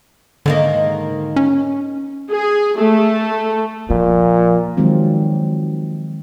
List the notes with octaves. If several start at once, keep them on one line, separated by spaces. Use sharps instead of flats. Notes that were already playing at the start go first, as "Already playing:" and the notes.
G#2 D3 D#3 A#3
C#4
G#4
A3
A#2 F3
D#3 F3 F#3 G#3 C4